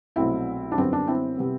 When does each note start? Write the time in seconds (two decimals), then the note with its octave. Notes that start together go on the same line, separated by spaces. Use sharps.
0.16 C2 B2 F#3 A3 C4 E4
0.72 D4
0.77 F#2 D3 G3 B3 C4
0.93 D4
1.07 C4 E4
1.38 C3 G3 B3